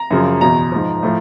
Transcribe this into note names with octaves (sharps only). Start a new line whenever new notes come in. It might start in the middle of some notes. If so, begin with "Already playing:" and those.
Already playing: A#5
F#2 C#3 F3
E2 B2 A#5
G#2 F3
A2 F3